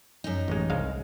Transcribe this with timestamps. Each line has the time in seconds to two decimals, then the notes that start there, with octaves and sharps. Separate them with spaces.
0.24 F#2 D#4
0.48 A1 G#3
0.70 C2 G#3 F5